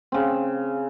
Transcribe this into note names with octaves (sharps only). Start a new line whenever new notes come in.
C#3 C4